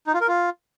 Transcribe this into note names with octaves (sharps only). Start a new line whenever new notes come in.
D#4
F4
A#4
F4